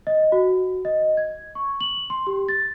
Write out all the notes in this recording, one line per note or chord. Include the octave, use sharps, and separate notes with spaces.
D#5
F#4
D#5
G#6
C#6
F#7
C6
G4
A6